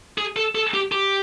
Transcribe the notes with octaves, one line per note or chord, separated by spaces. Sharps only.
G#4
A4
A4
G4
G4